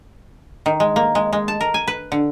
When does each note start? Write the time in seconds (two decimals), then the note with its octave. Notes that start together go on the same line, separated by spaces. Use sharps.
0.66 D#3
0.80 G#3
0.96 A#3
1.15 G#3
1.33 G#3
1.48 A5
1.61 A#4
1.74 G#5
1.87 B4
2.12 D3